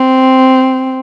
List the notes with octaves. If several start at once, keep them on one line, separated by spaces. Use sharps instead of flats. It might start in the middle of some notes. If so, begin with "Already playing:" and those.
Already playing: C4